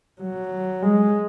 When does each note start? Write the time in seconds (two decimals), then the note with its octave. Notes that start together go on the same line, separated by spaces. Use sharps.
0.22 F#3
0.82 G#3